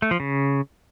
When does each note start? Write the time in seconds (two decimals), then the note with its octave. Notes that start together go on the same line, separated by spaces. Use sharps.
0.02 A3
0.11 F3
0.20 C#3